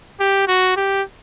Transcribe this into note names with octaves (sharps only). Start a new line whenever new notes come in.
G4
F#4
G4